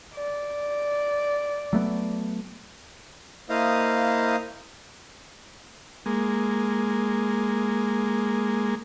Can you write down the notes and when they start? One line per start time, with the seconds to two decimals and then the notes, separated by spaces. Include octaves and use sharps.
0.15 D5
1.73 F#3 A3 B3
3.50 A#3 E4 C5 D#5 F5 D#6
6.06 G#3 A#3